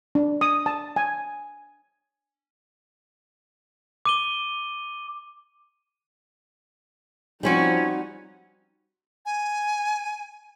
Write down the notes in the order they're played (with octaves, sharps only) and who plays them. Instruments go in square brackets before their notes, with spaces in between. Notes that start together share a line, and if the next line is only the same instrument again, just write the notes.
[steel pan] D4
D#6
A5
G#5
[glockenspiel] D6 D#7 G7
[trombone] F3 [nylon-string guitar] G3 C4 F#4 [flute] C#4 [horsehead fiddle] D#4
[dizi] G#5